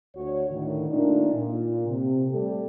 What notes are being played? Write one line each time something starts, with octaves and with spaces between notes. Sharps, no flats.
D2 F#4 C#5
A2 D3 D#3
A#2 D#3 A3 D4 D#4
A#2
C3
G3 A3 G4 A4